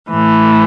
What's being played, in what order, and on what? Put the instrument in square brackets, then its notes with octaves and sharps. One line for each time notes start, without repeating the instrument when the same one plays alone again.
[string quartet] A2 E3